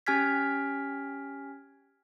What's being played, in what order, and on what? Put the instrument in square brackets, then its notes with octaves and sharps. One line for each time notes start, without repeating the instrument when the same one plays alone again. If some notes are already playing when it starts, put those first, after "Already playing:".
[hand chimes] C#4 G4 G#5 F6 G#6 B6